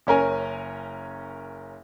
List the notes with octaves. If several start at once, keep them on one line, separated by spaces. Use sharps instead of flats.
F#1 C#4 A#4 G#5